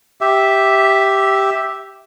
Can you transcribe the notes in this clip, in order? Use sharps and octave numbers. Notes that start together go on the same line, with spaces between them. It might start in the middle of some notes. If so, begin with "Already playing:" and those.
G4 E5